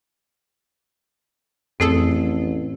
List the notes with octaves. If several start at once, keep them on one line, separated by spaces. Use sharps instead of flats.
A1 F2 A3 C4 G#4 A4